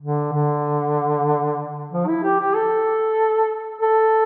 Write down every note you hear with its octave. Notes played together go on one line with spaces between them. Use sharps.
D3
D3
F3
E4
G4
G4
A4
A4